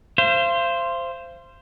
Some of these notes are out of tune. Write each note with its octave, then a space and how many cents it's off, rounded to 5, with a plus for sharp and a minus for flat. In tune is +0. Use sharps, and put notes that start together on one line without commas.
C5 +0 F5 -40